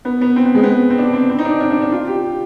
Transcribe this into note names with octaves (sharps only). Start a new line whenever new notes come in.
B3
B3
C4
B3
G#3
B3
C4
D4
C4
C4
D#4
D4
D4
D4
D4
F4
G4